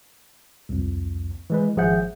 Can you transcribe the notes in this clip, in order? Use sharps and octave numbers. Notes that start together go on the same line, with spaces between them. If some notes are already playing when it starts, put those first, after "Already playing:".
C2 F2
E3 G#3 B4
G#1 F3 G#4 E5 F#5 G6